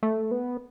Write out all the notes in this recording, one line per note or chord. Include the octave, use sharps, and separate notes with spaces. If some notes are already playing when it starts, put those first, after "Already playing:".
A3
B3